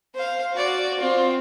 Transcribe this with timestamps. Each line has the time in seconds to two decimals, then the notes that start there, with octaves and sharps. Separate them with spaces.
0.15 C5 F5
0.53 F#4 D5
0.99 C4 F4